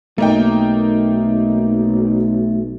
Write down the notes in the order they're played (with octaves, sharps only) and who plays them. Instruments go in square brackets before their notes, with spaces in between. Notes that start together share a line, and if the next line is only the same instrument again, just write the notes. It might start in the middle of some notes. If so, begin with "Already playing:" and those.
[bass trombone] B1 [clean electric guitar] A3 [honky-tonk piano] A#3 D#4 G5